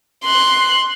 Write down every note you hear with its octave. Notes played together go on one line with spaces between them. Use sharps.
C6 F#6